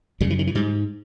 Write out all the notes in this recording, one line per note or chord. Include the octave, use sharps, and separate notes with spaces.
F#2 C#3 G3
E3
D#3
E3
G#2 G3